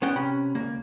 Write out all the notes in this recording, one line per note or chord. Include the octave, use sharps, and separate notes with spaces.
B3 C#4 F#5 G5
C3 C#4 B5
C#2 A#3